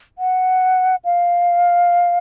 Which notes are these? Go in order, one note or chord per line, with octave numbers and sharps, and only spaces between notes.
F#5
F5